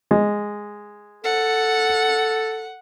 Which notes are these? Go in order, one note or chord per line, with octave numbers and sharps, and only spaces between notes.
G#3
A4 F#5